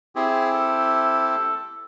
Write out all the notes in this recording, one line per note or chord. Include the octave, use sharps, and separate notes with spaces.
C4 E4 G4 G#4
A4